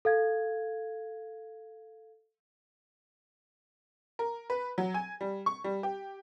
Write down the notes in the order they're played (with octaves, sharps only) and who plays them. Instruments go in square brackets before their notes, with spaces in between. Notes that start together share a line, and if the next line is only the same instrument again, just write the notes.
[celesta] A4 F5 G#6
[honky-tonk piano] A#4
B4
F#3
G#5
G3
C#6
G3
G4